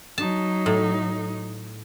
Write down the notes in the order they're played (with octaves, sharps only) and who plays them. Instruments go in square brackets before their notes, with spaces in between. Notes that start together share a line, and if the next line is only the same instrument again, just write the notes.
[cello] F#3 D#4 [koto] A5
[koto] A2